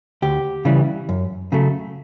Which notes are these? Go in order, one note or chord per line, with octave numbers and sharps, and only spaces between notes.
D2 G4
C#3 E3 G3
F#2
C#3 F#3 A3